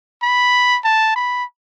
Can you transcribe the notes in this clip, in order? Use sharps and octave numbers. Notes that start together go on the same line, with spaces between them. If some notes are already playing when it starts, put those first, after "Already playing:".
B5
A5
B5